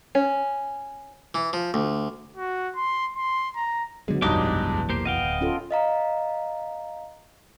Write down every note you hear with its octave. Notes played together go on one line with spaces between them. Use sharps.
C#4
E3
F3
D2
F#4
C6
C6
A#5
D3 F#3 G#3 B3
F1 B1 E2 G2 G#3 D#4 G4 D6
A#3 G4 C5
B3 D#5 F5 G5
D1
C#4 F4 A4
D#5 F5 A#5